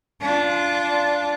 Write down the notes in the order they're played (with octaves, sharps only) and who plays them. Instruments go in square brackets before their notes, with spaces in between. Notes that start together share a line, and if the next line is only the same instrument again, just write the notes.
[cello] D4 F4